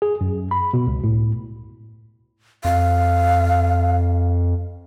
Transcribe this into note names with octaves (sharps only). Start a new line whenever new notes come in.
G#4
F#2
B5
B2
C#2
A2
F2 F5